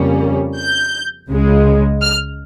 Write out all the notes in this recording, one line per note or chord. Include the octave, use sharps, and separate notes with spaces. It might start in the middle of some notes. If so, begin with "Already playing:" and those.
Already playing: F2 C#3 G3 A#3 C#4
G6
C#2 C#3 G#3
F6